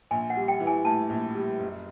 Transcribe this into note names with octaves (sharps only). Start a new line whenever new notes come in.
A#1 G#5
F#5
G3
G5
E3
G#5
A2 A5
A#1
G3
F#1